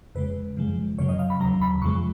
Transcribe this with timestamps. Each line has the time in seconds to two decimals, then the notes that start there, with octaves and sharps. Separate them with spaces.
0.15 F2 C#3 G#3 B4
0.57 F#2 C#3 F3 G#3
0.99 F#2 C#3 F#3 C#5
1.09 D#5
1.19 F5
1.30 B5
1.40 D#2 C#3 F#3 A#5
1.61 B5
1.82 F2 C#3 F3 G#3 C#6